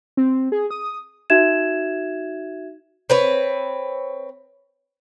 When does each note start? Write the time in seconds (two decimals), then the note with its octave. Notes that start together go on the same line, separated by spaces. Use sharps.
0.17 C4
0.52 G#4
0.70 D#6
1.30 D#4 F#4 E5 G#6 E7
3.10 C4 B4 C#5